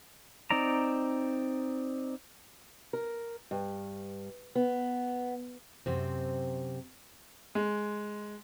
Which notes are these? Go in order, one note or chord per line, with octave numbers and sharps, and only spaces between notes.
C4 D#4 D5 A#5
A#4
G2
B3
F#2 C3 C4
G#3